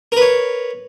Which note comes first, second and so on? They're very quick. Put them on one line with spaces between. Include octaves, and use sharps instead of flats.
A#4 B4 C#5